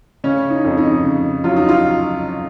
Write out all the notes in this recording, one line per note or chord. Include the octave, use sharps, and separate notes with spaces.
C#3 C#4
D#4
F2
D#4
C#3
F#3 F4
D#4
F4